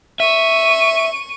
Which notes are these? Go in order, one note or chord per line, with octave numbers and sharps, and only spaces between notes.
E5 C#6 D#7